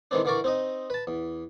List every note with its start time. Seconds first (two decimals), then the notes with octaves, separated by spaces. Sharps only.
0.11 D#3 E3 G#3 C4 D4
0.25 D3 E3 D4 A#4 D5 C#6
0.44 C4 D#4 D#5
0.90 B4 A5
1.07 E2